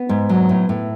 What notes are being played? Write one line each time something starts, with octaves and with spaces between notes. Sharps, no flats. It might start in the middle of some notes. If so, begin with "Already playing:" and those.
Already playing: B3
G#2
F#3
A2
A2